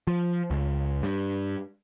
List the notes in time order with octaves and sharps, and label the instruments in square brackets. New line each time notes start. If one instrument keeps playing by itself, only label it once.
[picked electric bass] F3
C#2
G2